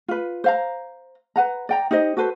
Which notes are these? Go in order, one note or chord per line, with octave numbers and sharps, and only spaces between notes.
F4 B4
C5 F5 A#5
B4 F#5 A#5
D5 G5 A#5
D#4 G4 C5 D#5
F#4 A4 B4 C5